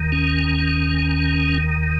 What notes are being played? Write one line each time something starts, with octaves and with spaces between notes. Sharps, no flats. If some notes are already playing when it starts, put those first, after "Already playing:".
Already playing: D#2 D#3
C#4